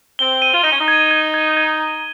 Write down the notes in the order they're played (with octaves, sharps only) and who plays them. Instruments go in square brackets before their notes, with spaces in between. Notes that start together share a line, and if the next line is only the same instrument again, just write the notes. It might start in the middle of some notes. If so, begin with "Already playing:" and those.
[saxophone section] C4 [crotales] G7
[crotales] D#7
[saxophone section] F4
[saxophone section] D#4 [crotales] D#7
[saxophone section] C#4
D#4
[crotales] G#6
G#6
G#6
G#6
G#6